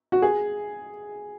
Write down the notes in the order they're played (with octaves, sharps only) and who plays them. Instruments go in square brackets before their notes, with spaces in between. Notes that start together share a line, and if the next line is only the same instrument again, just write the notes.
[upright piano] F#4
G#4